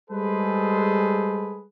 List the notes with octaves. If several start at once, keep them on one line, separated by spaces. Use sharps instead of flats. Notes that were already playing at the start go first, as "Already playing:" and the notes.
G3 G#3 G#4 A4 B4 C5